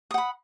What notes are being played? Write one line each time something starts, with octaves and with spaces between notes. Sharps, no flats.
F#5 B5 D#6